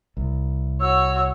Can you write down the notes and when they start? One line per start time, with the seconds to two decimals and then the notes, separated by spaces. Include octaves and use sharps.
0.17 C2
0.81 F#4 C#5 E6